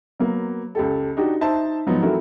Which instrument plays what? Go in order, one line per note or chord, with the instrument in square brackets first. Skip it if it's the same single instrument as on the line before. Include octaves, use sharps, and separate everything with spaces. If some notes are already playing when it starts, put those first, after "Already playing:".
[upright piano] F#3 A#3 B3
C#2 G4 A4
D4 D#4 F#4 G4
D#4 C5 E5 A5
G#2 F3 F#3 B3 D#4
E3 A3 C4 E4 F#4 A#4